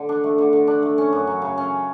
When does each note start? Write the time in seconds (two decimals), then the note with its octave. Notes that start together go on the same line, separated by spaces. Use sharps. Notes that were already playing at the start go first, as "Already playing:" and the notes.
Already playing: D3
0.09 D4
0.24 A3
0.38 D3
0.53 D3
0.67 D4
0.83 A3
0.98 C#4
1.13 F#2
1.27 F#3
1.42 C#3
1.58 C#4